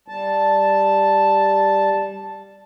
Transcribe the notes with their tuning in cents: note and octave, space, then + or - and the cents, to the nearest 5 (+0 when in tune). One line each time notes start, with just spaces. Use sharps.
G3 +0 A5 +0